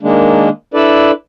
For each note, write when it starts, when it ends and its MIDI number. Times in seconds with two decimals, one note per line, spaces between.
0.01 0.49 51
0.01 0.49 56
0.01 0.49 58
0.01 0.49 62
0.74 1.11 62
0.74 1.11 64
0.74 1.11 69
0.74 1.11 71
0.74 1.11 74